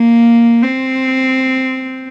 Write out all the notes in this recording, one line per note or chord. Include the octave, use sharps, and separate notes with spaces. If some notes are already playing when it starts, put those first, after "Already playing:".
Already playing: A#3
C4